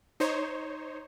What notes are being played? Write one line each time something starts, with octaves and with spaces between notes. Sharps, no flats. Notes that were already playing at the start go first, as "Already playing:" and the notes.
D#4 C5 C#5